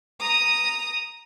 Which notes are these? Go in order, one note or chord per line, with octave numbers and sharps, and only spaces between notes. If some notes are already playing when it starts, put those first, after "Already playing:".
A#5 D#6